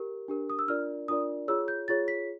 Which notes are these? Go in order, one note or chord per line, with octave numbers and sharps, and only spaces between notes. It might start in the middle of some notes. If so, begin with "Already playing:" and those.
Already playing: G4 A#4
D4 G4 A#4
D#6
E6
D4 F4 A#4 D5 F6
D4 F4 A#4 D5 D#6
F4 G#4 C#5 E6
G6
F4 G#4 C#5 A6
B6